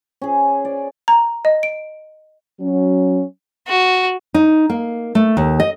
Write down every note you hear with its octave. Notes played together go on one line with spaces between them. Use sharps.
C#4 G#4
D5
A#5
D#5
D7
F#3 C#4
F#4
D#4
A#3
A3
D#2
D#5